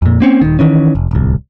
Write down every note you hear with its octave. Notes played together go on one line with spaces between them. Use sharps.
F2 A#2
A#3 C4 C#4
D#1 D#3
D#3 E3 C#4
F1
D1 C2